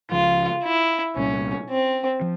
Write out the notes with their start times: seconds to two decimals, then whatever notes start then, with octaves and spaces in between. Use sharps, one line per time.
0.11 C#2 C#3 F3 F4
0.64 E4
1.16 C2 A#2 G3 C#4
1.69 C4
2.21 F3